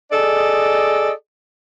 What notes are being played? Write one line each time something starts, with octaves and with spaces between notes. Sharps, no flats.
G#4 A4 D5 D#5